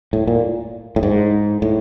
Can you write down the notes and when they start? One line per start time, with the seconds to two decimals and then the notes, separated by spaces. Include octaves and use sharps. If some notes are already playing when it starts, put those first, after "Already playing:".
0.13 A2
0.27 A#2
0.96 A2
1.03 G#2
1.62 A2